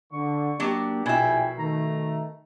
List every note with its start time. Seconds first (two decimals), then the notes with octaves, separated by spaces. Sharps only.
0.13 D3 C#6
0.60 F#3 A#3 D4 G4
1.06 A#1 B2 E4 E5 G5 G#5
1.58 D#3 A3 A#5